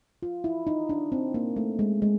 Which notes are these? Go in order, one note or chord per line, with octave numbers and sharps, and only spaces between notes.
F4
E4
D#4
D4
C4
A#3
A3
G#3
G#3